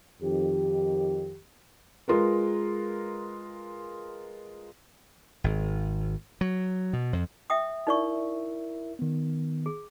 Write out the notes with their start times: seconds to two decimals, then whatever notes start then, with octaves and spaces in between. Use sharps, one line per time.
0.22 F2 D#3 G4
2.08 G#3 F4 A#4 B4
5.44 G#1
6.41 F#3
6.93 B2
7.13 F2
7.50 E5 G5 D#6
7.87 D#4 E4 A#4 D5 E5 C#6
8.99 D#3 B3
9.66 G#4